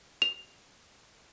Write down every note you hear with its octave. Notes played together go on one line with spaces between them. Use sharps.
F7